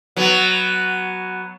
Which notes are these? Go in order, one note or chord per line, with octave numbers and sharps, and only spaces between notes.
F#3 B3